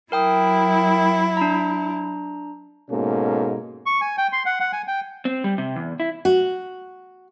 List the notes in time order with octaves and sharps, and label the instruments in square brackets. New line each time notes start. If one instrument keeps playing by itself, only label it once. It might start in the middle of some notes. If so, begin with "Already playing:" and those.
[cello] F#3 E4 [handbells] A#4 G5 D#6
[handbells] D4 A#5
[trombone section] G#2 B2 A#3 C#4 A4
[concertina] C#6
G#5
G5
C6
F#5
F#5
G#5
G5
[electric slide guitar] C4
G3
C3
E2
E4
[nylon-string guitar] F#4